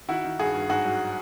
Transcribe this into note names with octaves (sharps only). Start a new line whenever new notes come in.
D#3 E4 F#4
D#3
G2 F#4 G#4
G2
G#2 F#4 G#4
F#3